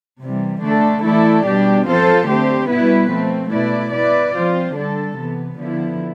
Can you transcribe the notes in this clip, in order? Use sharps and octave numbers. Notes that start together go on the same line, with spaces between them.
C3 E3 G3
D3 A3 D4 A4
E3 A3 E4 A4 D5
B2 G3 D4 G4
F3 C4 F4 A4 C5
D3 A3 C4 G4 C5
B2 G3 B3 E4 B4
F3 A3 C4
B2 A3 E4 B4 D5
B3 E4 B4 D5
F3 C4 F4 C5
D3 G3 D4 A4
C3 E3 B3
D3 F3 B3 E4